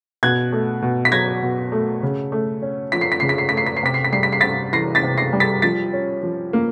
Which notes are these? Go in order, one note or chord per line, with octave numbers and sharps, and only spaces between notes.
B2 F#6 G#6
A3
B2
B6
F#3 G#6 A#6
B2
A3
C#3
A3
C#4
F3 B6
C7
B6
C#3 C7
B6
C7
A3 B6
C7
B6
C7
C3 B6
C7
B6
G3 C7
B6
C7
C3 A6 B6
E3 A#6 C7
A6 B6
C3
A#6 C7
G3
A6 B6
F3 A6 B6
C#4
F3
A#3